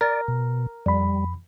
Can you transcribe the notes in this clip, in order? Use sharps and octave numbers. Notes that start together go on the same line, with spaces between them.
A#4 D5
B2
F2 G3 B5